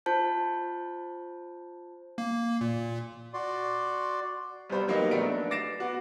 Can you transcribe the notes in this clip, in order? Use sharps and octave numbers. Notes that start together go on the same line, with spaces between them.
F4 C5 A5 G6
A#3
A#2
F#4 D5 C6
C2 G3 B3 C5 B5 C6
D#3 F#3 A#3 B3 G4 D#5
A#1 A3 B3 D7
D4
D6 A6 A#6 C7 D7 E7
B3 F#4